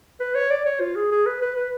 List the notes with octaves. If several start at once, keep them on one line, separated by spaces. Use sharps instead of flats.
B4
C#5
D5
C#5
F4
G#4
G#4
B4
B4
B4